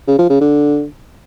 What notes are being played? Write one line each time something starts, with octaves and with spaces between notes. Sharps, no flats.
C#3
F3
C#3
D3